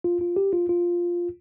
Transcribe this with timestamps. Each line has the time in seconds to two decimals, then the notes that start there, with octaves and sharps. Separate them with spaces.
0.04 F4
0.21 F4
0.36 G4
0.53 F4
0.69 F4